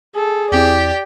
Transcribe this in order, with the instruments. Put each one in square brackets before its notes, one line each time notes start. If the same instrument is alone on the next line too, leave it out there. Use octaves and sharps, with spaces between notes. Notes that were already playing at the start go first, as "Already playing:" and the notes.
[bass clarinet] G#4 [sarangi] A4
[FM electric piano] E2 C4 E4 [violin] G4 [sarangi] D5